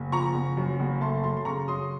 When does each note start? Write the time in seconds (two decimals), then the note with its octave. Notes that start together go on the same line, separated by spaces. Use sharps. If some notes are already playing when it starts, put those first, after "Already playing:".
Already playing: F#1
0.12 F3 A#5 C#6
0.34 F#1
0.57 F#2
0.80 F#1
1.01 A3 A5 C6
1.23 F#2 A5 C6
1.37 C6
1.45 C#3 A#5 C#6
1.68 F#2 C6 D#6